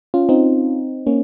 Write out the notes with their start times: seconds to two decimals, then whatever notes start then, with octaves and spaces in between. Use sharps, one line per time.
0.14 C#4 F4
0.29 C4 D#4
1.07 A#3 C#4